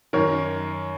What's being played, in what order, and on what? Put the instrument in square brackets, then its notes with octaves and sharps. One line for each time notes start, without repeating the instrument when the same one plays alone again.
[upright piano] F#2 D#3 A#4 C#5